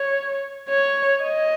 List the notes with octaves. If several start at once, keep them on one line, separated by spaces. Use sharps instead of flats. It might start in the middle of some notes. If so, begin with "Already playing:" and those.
Already playing: C#5
C#5
D#5